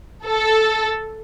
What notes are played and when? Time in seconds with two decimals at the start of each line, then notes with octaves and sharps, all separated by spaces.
0.25 A4